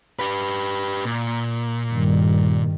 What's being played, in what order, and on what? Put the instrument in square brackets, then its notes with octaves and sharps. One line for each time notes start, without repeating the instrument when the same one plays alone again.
[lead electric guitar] G4 B4
A#2
[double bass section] G2 D#3 G3